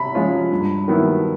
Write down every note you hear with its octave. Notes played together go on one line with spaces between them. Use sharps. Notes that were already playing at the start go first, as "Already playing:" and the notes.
Already playing: C3 B5
F3 G#3 C#4 F4
G2
D#3 F#3 B3 E4